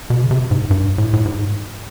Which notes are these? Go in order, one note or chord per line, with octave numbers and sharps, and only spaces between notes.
B2
C#3
C3
G#2
G2
A2
A2
G#2